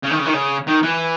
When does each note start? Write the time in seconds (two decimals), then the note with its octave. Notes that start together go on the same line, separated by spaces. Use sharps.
0.03 C#3
0.11 D#3
0.20 C#3
0.26 D#3
0.34 C#3
0.67 D#3
0.83 E3